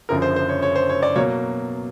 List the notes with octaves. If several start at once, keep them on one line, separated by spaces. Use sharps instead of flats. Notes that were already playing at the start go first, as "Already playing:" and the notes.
F#1 F#2 D3 F3 A#4
C5
C5
C#5
C#5
C5
C#5
D5
B2 F#3 A#3 C#5